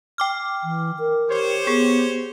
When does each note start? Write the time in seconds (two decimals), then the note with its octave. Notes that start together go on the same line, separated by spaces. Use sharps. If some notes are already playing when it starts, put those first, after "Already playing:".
0.18 G5 D6 F6
0.63 E3
0.99 A#4
1.29 G4 C5 C#5
1.67 B3 G#4